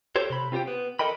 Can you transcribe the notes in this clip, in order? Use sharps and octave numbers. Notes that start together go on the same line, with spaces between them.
G4 A4 C5 C#5
C3 B5
C4 F4 G4 C5 G5
B3
A4 A#4 D#5 G5 B5